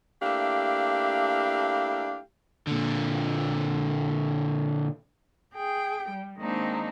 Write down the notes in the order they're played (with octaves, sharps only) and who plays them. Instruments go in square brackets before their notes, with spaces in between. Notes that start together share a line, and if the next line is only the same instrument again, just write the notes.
[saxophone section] A3 A#3 D4 E4 G4 F5
[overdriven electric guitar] A#2 D3
[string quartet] G#4 G5
G3
D#3 G#3 A#3 C4 D4 D#4